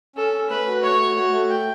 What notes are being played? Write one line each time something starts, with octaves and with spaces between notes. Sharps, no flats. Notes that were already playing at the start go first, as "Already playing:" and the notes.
C#4 A4
C#4
A3 B4
F#4
A3 C#5
F#4
F#4
A3
G5